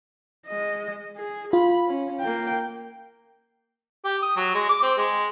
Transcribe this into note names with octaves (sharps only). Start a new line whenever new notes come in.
G#3 D#5
G#4
F4 B5
C#4
A#3 G5
G4
D#6
F#3
G#3
D6
C4
G#3